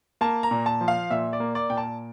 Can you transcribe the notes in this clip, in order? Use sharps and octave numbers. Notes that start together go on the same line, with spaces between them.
A#3 A5
A#5
A#2
A5
F3
F5
A#2 E5
D5
A#3
D5
A#2 G5
A5